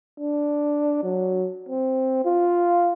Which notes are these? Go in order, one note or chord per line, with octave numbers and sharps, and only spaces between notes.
D4
F#3
C4
F4